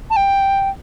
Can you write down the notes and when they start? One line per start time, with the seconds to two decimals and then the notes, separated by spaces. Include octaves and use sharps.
0.10 A5
0.16 G5